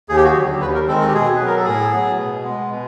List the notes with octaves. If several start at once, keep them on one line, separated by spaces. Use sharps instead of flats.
D#2 G#4
G4
F#4
D3 F#3 G4
D#2 B4
A#4
D#3 G#3 C4 A4
A4
G4
B2 G#4
F#3 B3 B4
A#4
A4
A2 G#4
F#3 B3
B2
G#3 B3
B2